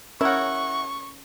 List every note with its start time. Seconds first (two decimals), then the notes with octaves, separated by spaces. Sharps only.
0.21 C#4 E4 F#4 A#4 C#5 C#6